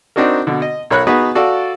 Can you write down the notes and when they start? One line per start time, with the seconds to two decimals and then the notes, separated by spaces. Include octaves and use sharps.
0.16 C4 D4 D#4 F#4 A#4
0.47 B2 D3
0.62 D#5
0.90 B1 A#4 C#5 B5 F#6
1.07 B3 D#4 F#4 G#4 B4
1.35 F#4 A4 D5 F5